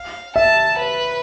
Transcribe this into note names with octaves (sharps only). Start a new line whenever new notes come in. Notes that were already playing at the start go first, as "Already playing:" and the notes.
Already playing: F5
E5 A5
B4